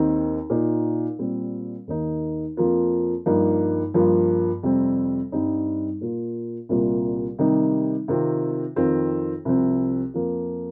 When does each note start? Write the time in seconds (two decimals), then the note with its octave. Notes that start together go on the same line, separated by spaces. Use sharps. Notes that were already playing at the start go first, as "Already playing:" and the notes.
Already playing: D#2 D#3 C4 D#4
0.50 A#2 A#3 D#4
1.19 A#2 G3 C4
1.87 D#2 D#3 A#3 D#4
2.57 F2 F3 A#3 F4
3.26 G2 F3 A#3 D#4
3.94 G2 F3 A#3 F4
4.63 F2 C3 G3 C4
5.32 G2 G3 C4 D#4
6.01 A#2 A#3 F4
6.69 C2 A#2 G3 A#3 F4
7.39 C3 D#3 G3 D#4
8.08 C3 D#3 C4 F4
8.76 F2 D#3 C4 F4
9.45 C2 C3 F3 C4
10.14 F2 F3 A#3 F4